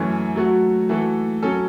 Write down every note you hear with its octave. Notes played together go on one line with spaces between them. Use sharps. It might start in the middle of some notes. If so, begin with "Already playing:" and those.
Already playing: F#2 E3 A3 C#4
F#3 A3 F#4
E3 A3 F#4 A4
F#3 C#4 A4